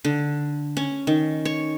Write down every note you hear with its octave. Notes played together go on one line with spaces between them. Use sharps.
D3
C#4
D#3
C#5